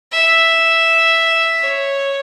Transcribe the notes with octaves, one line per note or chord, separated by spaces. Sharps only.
E5
C#5